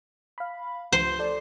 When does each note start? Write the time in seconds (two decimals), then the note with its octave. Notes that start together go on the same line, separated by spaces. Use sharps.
0.38 F5 B5
0.92 C#2 F3 C5
1.19 A4 D5